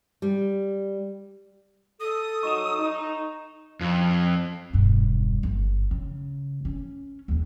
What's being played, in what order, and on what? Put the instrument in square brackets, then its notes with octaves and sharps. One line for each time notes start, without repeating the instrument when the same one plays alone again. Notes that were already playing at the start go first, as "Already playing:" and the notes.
[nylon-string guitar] G3
[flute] A4 [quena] D#6
[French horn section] F#3 D#4 [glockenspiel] C#6 E7
[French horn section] D#4
[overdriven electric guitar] F2
[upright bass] E1 G2
G1
C#3
C#4
D#2 D3